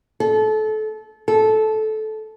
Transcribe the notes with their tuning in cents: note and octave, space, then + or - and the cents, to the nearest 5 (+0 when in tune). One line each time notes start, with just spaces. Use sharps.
A4 -25
A4 -15